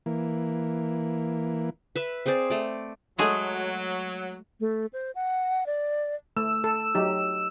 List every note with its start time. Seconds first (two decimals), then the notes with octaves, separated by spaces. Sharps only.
0.06 E3 A#3
1.96 B4 E5
2.26 C4 G#4 C5 D5
2.50 A3 D5
3.19 F#3 G#3 A3 G#4
4.60 A3
4.93 C5
5.15 F#5
5.66 D5
6.37 A3 E6
6.64 A4
6.95 F#3 D#4 G4